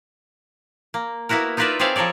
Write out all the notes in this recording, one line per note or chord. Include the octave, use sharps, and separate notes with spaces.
A#3
A#3 B3 E4 F#4 A#4
D#4 F4 A#4 B4 D5 E5
C4 G#4 C#5 D5 E5 F5
F3 A4 A#4 C#5 D5